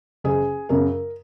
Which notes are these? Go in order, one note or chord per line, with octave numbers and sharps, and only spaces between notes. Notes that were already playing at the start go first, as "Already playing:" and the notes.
F#1 G#4
F#2 C#3 A#4